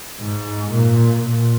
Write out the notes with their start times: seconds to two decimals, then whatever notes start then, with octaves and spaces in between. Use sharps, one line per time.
0.20 G#2
0.71 A#2
1.23 A#2